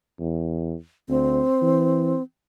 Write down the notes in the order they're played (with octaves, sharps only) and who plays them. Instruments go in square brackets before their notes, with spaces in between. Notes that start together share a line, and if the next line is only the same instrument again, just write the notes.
[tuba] E2
[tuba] D2 [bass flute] C4
[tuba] E3